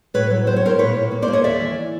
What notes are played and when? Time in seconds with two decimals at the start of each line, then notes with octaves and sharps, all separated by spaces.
0.14 A2 B4 C#5
0.30 F#3
0.47 A2 C5
0.56 C#5
0.63 A2 A#4 C5
0.79 A#2 B4 C#5
0.95 A#2
1.12 A#3
1.22 C5 D5
1.28 A#3
1.33 C#5 D#5
1.44 D#2 D5 E5
1.60 E3